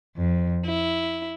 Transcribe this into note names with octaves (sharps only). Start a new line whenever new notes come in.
F2
E4